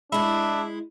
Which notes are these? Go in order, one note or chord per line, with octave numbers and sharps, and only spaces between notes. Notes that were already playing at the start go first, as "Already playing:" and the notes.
G#3 D4 E4 E5 B5